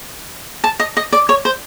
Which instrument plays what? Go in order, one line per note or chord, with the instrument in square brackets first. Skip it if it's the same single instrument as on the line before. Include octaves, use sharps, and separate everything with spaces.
[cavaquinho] A5
D#5
D#5
D5
C#5
C5